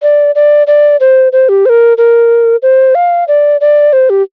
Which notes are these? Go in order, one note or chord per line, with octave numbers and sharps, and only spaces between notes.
D5
D5
D5
C5
C5
G4
C5
A#4
A#4
C5
F5
D5
D5
C5
G4